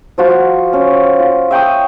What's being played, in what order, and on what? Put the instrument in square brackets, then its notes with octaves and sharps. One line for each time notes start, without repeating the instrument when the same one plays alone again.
[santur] F3 F4 F#4
C#4
F4
E5 G5 C#6 D#6